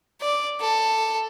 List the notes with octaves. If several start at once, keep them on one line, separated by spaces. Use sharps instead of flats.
D5
A4